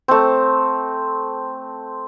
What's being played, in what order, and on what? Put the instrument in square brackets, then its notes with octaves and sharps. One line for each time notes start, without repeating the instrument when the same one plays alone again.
[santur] A3 C4